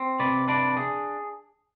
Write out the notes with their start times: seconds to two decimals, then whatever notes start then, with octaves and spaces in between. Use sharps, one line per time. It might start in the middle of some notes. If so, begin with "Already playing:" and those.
Already playing: C4
0.20 C3 B4 D5
0.48 D4 B4 D5
0.77 G#4